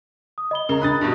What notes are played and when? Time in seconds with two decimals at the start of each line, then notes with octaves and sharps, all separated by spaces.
0.38 D#6
0.51 D#5 B5 G7
0.69 C#3 A#4 A#5
0.82 D4 B5 D#6 F#6 A6
1.01 G2 B2